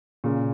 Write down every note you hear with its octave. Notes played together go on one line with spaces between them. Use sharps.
A#2 C#3